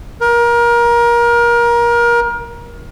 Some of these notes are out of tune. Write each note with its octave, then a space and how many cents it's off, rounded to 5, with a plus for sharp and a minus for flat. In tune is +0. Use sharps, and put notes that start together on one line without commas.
A#4 +25